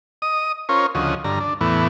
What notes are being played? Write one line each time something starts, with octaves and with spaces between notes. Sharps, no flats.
D#5 D#6
C#4 F4 A#4 C5 C#5
D2 C#3 F3 F#4 D#5
G2 D3 A#5
D4
E2 A2 E3 B3